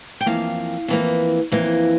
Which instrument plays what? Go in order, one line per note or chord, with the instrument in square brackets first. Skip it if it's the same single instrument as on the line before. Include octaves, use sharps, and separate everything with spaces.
[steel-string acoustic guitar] G5
F2 E3 A#3 F5
F2 E3 A#3
F2 E3 A#3